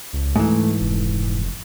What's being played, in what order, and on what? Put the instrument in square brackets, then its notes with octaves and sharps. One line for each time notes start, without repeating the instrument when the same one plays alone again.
[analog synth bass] C#2
[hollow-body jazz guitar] G#2 E3 [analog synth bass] A3
[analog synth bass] F1